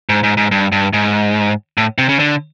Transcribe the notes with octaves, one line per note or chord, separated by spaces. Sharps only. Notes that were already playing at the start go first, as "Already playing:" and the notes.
G#2
G#2
G#2
G2
G2
G#2
A2
C3
C#3
D3